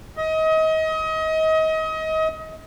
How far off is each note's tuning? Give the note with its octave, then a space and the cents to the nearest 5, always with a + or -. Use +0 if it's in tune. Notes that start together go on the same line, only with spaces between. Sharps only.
D#5 +30